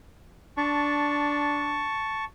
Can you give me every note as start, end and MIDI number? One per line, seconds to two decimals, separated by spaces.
0.57 1.91 62
0.57 2.25 81
0.57 2.25 85